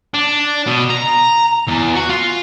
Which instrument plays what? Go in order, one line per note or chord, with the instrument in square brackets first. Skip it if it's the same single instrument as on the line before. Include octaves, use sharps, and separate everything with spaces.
[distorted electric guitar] D4
B2
A#5
E2
F#4
F4